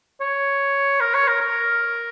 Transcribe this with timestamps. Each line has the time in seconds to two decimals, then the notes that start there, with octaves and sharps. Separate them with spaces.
0.20 C#5
1.00 A#4
1.14 C#5
1.28 A#4
1.40 A#4